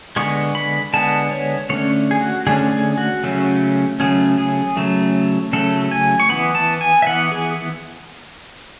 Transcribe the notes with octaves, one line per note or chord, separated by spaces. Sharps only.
D3 G#3 B3 C#6
B5
D3 G#3 B3 A5
C#5
D3 A3 C#4 C#5
G#4
F#4
D3 A3 C#4 G#4
G#4
F#4
C#3 F#3 A3 C#4
C#3 F#3 A3 C#4 G#4
G#4
C#3 F#3 A3
C#3 F#3 A3 A4
G#5
C#6
E3 B3 B5
A5
G#5
E5
E3 B3 F#5
G#4